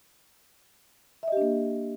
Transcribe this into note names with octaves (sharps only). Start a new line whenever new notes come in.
A#3 D4 G4 D#5 E5